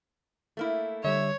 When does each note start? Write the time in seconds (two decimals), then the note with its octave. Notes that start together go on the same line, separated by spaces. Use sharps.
0.57 A3 A#3 E4
1.04 D3 G3 C#5 E5